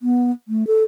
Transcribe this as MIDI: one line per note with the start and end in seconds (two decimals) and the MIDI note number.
0.01 0.31 59
0.48 0.66 57
0.67 0.83 69